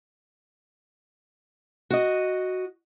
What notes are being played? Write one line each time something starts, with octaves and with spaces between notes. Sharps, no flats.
F#4 D#5